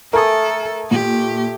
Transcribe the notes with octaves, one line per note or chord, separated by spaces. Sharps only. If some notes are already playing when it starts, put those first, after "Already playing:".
A3 A4 A#4 G#5 D#6
A#2 G4